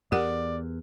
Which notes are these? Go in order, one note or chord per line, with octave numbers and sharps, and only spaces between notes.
E2 G4 A#4 D5 F#5